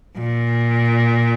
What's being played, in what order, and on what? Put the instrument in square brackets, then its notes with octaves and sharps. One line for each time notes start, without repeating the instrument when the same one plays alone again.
[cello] A#2